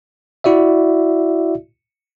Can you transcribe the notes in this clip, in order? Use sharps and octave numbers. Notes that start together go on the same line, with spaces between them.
E4 F#4 D5 E5